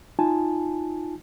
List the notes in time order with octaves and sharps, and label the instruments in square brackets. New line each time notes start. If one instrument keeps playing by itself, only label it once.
[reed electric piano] D#4 F4 G#5 A5